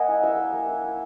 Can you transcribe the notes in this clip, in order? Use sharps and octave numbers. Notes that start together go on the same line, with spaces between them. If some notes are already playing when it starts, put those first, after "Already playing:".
Already playing: A#3 D#5 F#5 G#5
E4
E4 E5
A#3
A#3
E4
E4